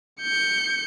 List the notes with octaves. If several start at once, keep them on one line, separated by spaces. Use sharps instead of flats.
G6 C#7